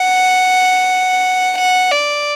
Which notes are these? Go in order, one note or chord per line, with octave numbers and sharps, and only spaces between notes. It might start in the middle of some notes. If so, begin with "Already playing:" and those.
Already playing: F#5
F#5
D5